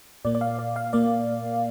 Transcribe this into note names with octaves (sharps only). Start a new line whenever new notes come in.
A#2 A#3 D5
D5
F5
D5
F5
A#2 A#3 D5